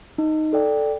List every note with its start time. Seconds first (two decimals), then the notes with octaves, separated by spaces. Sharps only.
0.18 D#4
0.53 A4 D5 G5